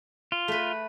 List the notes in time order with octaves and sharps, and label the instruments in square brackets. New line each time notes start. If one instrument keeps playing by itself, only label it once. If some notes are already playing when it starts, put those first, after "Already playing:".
[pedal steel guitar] F4
[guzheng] A3 B4